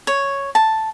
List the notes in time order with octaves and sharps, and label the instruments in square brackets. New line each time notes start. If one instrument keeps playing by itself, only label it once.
[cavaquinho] C#5
A5